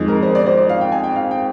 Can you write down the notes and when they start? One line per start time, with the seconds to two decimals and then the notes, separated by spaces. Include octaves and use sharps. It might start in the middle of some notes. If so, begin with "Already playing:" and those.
Already playing: F2 D#3 G#3
0.08 A#4
0.23 C5
0.35 D5
0.46 C5
0.57 D5
0.69 F5
0.81 G5
0.92 G#5
1.04 G5
1.16 F5
1.31 G5